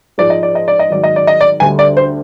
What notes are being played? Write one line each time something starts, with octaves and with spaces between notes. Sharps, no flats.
G#2 F3 G#3 D5
D#5
D5
D#5
D5
D#5
G#2 D#3 F#3 D5
D#5
D5
D#5
D5
D2 D3 G3 G#5
D5
C5